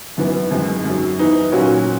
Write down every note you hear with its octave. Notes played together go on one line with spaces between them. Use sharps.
G#1 F#2 E3 B3
G#1 F#2 D#3 G#3
F#2 D#3 F#3
G#2 E3 B3 D#4
A#2 F#3 C#4 F#4